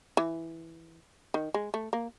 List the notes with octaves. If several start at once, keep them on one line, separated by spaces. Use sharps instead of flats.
E3
D#3
G#3
A3
A#3